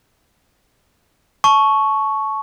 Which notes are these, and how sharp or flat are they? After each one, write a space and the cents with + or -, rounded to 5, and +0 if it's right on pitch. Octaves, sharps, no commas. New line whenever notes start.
A5 -20 C#6 +0